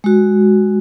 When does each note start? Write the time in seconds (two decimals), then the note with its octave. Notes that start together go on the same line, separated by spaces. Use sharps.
0.04 G#3 F#4